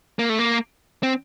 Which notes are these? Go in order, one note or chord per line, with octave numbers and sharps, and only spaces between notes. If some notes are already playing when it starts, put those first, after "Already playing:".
A#3
A3
A#3
C4